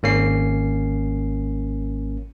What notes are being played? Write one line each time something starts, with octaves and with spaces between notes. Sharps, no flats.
G#1 A#3 C#4 C7